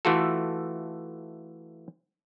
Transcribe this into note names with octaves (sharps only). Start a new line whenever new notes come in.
E3 A3 F4 F#4 A4